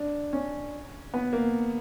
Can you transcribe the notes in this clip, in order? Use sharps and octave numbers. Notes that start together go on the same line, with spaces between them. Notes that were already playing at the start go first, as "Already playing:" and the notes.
Already playing: D4
C#4
B3
A#3